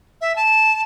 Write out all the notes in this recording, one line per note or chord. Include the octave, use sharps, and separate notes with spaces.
E5
A5